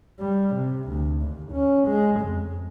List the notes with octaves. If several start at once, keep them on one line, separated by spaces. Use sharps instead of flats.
G3
C3
D2
D#2
C#4
G#3
F2